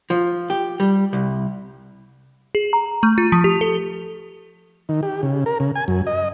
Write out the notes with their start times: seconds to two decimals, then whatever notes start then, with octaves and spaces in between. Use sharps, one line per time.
0.10 F3
0.50 G4
0.80 G3
1.13 C2
2.55 G#4
2.73 A#5
3.03 A3
3.18 F4
3.32 F3
3.44 G4
3.61 A4
4.89 D#3
5.03 G4
5.23 C#3
5.46 A#4
5.60 C#3
5.76 G#5
5.88 F#2
6.07 D#5